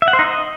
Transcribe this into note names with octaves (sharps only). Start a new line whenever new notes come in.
E5
F#5
C5
D#4
D#5